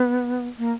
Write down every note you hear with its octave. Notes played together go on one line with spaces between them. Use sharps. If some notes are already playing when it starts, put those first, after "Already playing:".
Already playing: B3
A#3